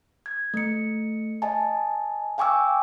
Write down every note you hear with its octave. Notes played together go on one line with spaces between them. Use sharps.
G#6
A3 C#7
D#5 G#5 A5
F5 G5 G#5 C#6 D6 E6